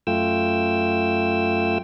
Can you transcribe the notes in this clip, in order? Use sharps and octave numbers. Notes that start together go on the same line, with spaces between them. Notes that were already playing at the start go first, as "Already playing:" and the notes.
F#2 A3 F4 G5 E6